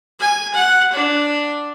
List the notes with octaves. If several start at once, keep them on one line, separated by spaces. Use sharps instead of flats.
G#5
F#5
D4